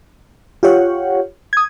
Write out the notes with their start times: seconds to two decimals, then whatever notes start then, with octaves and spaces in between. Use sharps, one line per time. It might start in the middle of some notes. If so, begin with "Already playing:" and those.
0.63 F4 G4 C#5 F#5
1.53 D#6 G#6